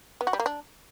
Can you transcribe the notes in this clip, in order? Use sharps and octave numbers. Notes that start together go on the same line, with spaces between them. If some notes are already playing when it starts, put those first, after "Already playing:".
B3
F#4
G3
A#3
D4